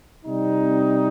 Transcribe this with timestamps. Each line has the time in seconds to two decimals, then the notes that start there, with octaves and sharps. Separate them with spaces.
0.25 C3 G3 C4 D#4